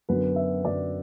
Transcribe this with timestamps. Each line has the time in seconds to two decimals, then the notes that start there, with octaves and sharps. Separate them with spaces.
0.09 F#2 D3 F#3 B3 B4
0.36 E5
0.64 F#2 D3 F#3 B3 D5